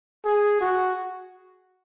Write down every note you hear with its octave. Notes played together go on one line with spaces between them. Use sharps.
G#4
F#4